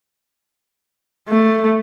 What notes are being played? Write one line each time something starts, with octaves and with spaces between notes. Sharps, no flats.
A3